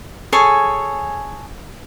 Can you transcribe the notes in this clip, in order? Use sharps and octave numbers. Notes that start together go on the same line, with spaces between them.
G#4 A4 C#5 G#5